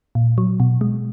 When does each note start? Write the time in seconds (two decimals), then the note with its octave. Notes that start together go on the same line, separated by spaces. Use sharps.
0.15 A#2
0.38 F#3
0.60 B2
0.81 G#3